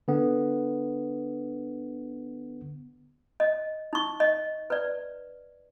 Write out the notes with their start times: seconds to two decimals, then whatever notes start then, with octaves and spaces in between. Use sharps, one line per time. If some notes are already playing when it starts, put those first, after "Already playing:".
0.08 D3 B3
3.40 D#5
3.93 D#4 C#6
4.20 D#5
4.70 B4 D5